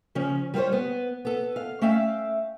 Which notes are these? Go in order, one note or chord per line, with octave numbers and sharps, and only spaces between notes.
C#3 F3 C#4
G3 F4 A#4 C5 C#5
B3
B3 A4
F5
A3 C#4 E5 F5 G5